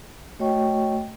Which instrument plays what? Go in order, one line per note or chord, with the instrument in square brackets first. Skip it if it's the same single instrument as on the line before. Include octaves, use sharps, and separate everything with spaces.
[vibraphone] A3 F#4 C#5 D#5 G5 C#6